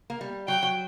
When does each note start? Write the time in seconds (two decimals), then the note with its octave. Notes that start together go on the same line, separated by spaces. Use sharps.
0.10 A#3
0.21 G3
0.48 F#3 G5
0.63 F#3